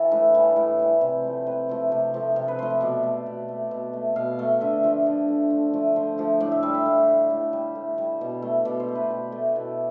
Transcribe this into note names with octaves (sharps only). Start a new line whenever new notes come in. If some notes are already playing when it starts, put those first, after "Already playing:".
Already playing: E3 G4 A4
A2 B4
E3 G3
A2
E3 G3
C3
F3 A3
C3 B4
F3 A3
C3 G4
F3 A3
C3
B4
F3 A3 C5
E5
B2 D5
A3
B2
A3
B2
A3
B2 F5
A3
D3 E5
F3 A3
D3 D5
F3 A3
D3
F3 A3
D3 C5
F3 A3
A2 D5
E5
G3 F5
E5
A2 F5
G3
A2 E5
G3
A2
G3
B2
A3
B2 D5
C5
A3
B4
B2 G4
A3
B2 E4